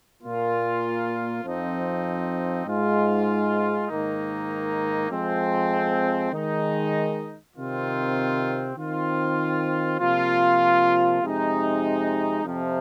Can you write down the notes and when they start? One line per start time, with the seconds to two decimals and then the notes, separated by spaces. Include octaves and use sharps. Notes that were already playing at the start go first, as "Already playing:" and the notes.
0.22 A#2 A#3 F4
1.43 F2 F3 C4 D#4
2.66 G#2 G#3 F4
3.88 G#2 D#3 A#3 D#4
5.10 F2 F3 G#3 C4
6.33 D#3 G#3 D#4
7.55 C3 D#3 C4 F4
8.77 D#3 C4 F4
9.99 C3 F3 A#3 F4
11.22 F2 C3 G#3 D#4
12.43 F2 C3 F3